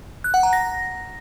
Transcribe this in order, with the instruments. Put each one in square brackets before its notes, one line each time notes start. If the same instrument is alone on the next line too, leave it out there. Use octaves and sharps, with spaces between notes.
[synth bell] F#6
F#5
A#5
A#6